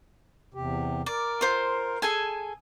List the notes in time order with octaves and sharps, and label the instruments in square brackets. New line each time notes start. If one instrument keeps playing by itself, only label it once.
[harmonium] E2 C3 G4
[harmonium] A#4 [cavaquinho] D5
[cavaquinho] F4 C5 C6
G#4 A4 G#5